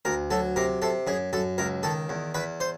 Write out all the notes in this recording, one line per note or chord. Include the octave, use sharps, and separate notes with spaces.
D2 A#4
F#3 A4
C3 A#4
C3 A4
F#2 G#4
F#2 A4
C#2 A#4
D#3 A4
E2
E2 B4
C5